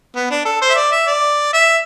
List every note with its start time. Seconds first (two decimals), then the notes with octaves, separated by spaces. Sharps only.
0.16 B3
0.30 D4
0.45 A4
0.62 C5
0.70 E5
0.76 D5
0.92 E5
1.07 D5
1.53 E5